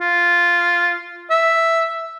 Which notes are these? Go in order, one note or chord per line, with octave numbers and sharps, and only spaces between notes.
F4
E5